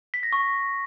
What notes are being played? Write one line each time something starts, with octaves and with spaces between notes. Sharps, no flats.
B6
A#6
C#6